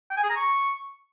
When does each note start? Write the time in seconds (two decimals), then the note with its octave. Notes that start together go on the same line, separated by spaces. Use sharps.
0.11 G5
0.17 G#5
0.23 G#4
0.30 A#5
0.36 C#6